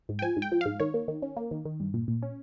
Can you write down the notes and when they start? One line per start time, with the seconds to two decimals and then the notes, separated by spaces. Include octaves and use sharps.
0.09 G#2
0.19 G5
0.22 F3 G#5
0.37 G#2
0.42 G5
0.52 F3
0.61 G#2 F5
0.80 D#3 C#5
0.94 A#3
1.08 D#3
1.22 C#4
1.37 A#3
1.51 D#3
1.65 D#3
1.80 G2
1.94 A#2
2.08 A#2
2.22 C#4